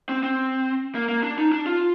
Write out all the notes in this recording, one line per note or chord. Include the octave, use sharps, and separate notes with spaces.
C4
C4
A#3
A#3
D4
D#4
D4
F4